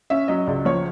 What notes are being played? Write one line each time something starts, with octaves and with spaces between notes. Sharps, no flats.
C#4 E5
F#3 D#5
C#2 D5
F3 C#5